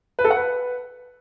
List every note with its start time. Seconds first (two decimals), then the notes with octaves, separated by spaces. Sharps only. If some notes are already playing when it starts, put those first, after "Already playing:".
0.19 B4
0.25 A4
0.31 F#5
0.36 B4